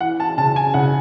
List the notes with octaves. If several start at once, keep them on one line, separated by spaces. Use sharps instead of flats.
E3 F#5
A5
C#3 A5
G#5
C#3 F#5